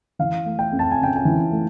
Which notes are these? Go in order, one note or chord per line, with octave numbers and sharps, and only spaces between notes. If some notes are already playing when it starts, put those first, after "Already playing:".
E3 F5
A3
G5
F2
A5
G#5
C#3 G5
G#5
E3
A3